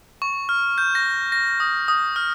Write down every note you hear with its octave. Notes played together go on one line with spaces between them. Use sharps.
C#6
F6
G6
A#6
A#6
D#6
D#6
F6